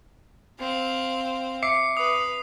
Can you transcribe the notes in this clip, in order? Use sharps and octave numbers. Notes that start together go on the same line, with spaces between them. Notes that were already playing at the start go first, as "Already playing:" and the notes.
C4 F5
E5 D6 C7 C#7
B4 D#6